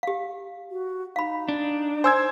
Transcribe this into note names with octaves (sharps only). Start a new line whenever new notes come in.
G4 F5
F#4
D#4 F5 B5
D4
C5 G#5 E6 G#6